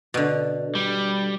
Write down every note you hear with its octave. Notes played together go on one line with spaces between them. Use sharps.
B2 D3
G3